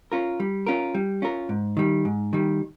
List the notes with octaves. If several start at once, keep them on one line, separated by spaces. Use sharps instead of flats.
C#4 F4 A#4
G3
C#4 F4 A#4
G3
C#4 F4 A#4
G#2
D#3 G3
G#2
D#3 G3